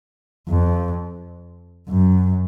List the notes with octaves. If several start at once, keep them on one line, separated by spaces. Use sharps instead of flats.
F2
F#2